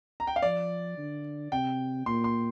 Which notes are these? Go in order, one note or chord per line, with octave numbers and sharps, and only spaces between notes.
A#5
G5
F5
F3 D5
D3
C3 G5
A#2 C6
C6